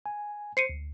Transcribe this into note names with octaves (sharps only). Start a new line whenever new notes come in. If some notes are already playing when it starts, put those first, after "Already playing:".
G#5
C5 C7 C#7 D#7
D2